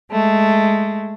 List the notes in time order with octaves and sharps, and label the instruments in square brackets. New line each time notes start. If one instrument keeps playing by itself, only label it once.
[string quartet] G#3 A3